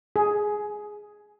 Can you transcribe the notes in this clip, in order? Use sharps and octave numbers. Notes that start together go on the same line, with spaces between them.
G#4